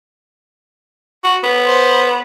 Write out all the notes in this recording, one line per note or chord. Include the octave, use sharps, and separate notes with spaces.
F#4
B3
C5